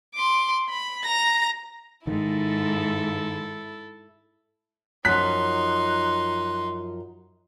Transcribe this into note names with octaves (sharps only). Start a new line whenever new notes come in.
C6 D6
B5
A#5 A#6
G#2 D#3 E4 A4
F#2 F3 D#4 C6 F#6 B6